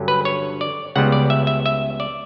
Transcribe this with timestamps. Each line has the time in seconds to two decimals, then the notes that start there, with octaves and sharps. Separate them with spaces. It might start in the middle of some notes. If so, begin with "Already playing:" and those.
Already playing: G2 D3 F#3 C#4
0.08 B4
0.25 C#5
0.61 D5
0.96 C#2 C#3 G3 B3 F#5
1.12 D5
1.30 E5
1.47 E5
1.66 E5
2.00 D5